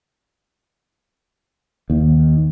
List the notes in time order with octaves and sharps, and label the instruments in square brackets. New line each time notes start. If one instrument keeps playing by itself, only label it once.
[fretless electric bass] D#2